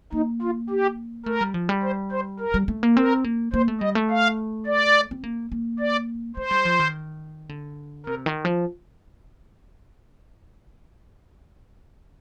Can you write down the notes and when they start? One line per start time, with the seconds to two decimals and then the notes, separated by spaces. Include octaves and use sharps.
0.12 A#3 D#4
0.42 F4
0.70 G4
1.26 A3 A#4
1.41 G3
1.54 F3
1.69 G3
1.83 C5
2.12 C5
2.40 A#4
2.54 G3
2.68 A3
2.83 A#3
2.96 C4 A#4
3.24 A#3
3.53 A#3 C5
3.68 A3
3.81 G3 D#5
3.95 A3
4.10 F5
4.66 D5
5.11 C4
5.24 A#3
5.52 A#3
5.79 D5
6.37 A3 C5
6.51 G3
6.65 F3
6.80 D#3
7.49 D3
8.06 C3 A#4
8.26 D#3
8.45 F3